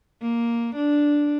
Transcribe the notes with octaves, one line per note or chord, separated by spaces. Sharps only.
A#3
D4